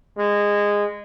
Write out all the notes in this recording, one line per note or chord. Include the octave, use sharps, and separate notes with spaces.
G#3